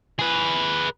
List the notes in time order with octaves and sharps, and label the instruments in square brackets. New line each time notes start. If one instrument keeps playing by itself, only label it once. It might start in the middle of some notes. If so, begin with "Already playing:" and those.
[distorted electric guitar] G#4 B4